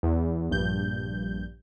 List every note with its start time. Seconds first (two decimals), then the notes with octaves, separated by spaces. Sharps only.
0.03 E2
0.50 A#1 G2 G6